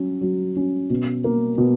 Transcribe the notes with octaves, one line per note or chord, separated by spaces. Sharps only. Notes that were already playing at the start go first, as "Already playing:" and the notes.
Already playing: F#3 C#4
F#3
C#4
B2
A#3
B2